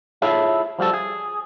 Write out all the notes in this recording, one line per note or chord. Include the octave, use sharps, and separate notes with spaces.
E4 F4 G#4 A4 C#5 E5
F3 G3 F#4 A4
G#4